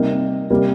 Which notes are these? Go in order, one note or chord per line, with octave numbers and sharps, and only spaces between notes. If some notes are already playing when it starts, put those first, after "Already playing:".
Already playing: C3 G3 A#3 D#4
C3 G3 A#3